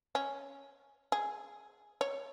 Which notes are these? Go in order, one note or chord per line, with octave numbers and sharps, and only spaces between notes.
C#4
G#4
C#5